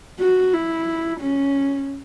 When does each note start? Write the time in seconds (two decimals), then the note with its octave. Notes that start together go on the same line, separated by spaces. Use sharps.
0.20 F#4
0.53 E4
1.20 C#4